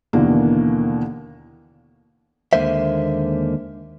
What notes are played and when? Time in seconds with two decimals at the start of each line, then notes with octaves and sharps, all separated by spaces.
0.13 D#2 B2 D3 E3 A#3
2.53 D#2 D3 G#3 A#3 C5 E5